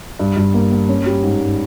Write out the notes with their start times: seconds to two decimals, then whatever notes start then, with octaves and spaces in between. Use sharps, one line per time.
0.19 G2
0.37 G2
0.54 A#3
0.71 A#3
0.89 C#4
1.06 G3
1.23 G#2
1.41 G#2